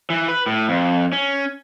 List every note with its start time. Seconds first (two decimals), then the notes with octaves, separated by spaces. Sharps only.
0.10 E3
0.28 B4
0.46 A2
0.69 F2
1.12 C#4